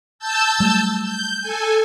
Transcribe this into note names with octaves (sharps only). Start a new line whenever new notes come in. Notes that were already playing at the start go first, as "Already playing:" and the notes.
A5 E6 G6
F#3 G3 A3
G6
A4 G#5